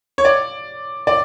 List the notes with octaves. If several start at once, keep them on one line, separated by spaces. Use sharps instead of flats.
C#5
D5
D5